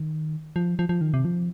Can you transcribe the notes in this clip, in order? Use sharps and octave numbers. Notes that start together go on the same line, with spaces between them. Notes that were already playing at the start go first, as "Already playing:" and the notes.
Already playing: D#3
F3
F3
F3
D#3
C3
F3